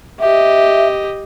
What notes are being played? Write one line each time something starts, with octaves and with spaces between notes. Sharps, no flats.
G4 D#5 E5